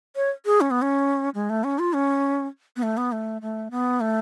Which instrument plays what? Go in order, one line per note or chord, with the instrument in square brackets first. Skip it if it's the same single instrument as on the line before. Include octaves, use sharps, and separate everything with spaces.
[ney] C#5
G#4
C#4
B3
C#4
G#3
A3
C#4
F4
C#4
B3
A3
B3
A3
A3
B3
A3